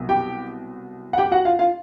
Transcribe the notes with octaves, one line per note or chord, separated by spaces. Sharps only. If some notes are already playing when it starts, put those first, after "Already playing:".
Already playing: C2 B2 F#3
G4 G5
F#5
G4 G5
F#4 F#5
F4 F5
F4 F5